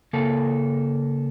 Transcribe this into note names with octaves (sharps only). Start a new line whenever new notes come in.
C#3 A#3 A4 A#4